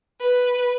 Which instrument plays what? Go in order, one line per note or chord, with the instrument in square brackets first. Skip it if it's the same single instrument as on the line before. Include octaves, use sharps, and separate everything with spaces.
[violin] B4